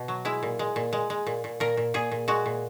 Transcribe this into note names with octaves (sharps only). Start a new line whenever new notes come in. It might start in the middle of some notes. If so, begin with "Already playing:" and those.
Already playing: B2
F#3
G#3 E4
A#2
G#3
A#2
G#3
G#3
A#2
A#2
A#2 A#4
A#2
A#2 G#4
A#2
G#3 F#4
A#2